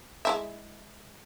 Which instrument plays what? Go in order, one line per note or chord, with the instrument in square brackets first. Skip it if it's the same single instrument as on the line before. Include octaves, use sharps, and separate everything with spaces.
[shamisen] G#3 E4 E5